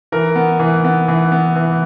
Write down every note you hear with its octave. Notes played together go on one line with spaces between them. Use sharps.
E3 A#4
B3
E3
B3
E3
B3
E3